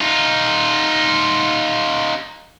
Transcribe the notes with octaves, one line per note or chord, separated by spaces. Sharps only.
D#4 F4